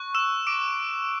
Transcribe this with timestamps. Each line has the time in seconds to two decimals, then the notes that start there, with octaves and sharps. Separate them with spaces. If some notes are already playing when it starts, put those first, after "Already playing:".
Already playing: C#6 F#6
0.15 E6 E7
0.47 D6 D7